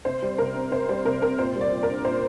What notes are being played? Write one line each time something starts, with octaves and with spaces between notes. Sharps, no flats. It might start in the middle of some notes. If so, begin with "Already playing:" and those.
C3 C5
G3
C3 A#4
C4
C3 C5
G3 C5
C3 A#4
C4 A#4
A#2 C5
G3
D5
A#2
A#4
D4
A#2 C5